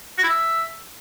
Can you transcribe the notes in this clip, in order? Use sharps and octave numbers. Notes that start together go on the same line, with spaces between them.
F#4
E4
E5